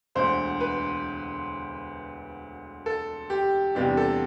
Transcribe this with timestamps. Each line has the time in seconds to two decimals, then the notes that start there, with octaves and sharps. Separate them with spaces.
0.15 E1 D2 D3 C5
0.60 B4
2.86 A4
3.30 G4
3.75 E2 C3 G3 B3 D4 G4
3.97 A4